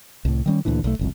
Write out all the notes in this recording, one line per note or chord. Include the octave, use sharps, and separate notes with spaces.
C2 A2
D#3 G3 C#4
D2 A#2 D3 E3
B1 A3
F#1 C2 F2